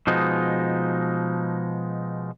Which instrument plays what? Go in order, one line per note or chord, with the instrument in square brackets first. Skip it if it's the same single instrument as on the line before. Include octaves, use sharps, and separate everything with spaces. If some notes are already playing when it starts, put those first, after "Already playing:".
[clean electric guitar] B2 F3 G#3 D#4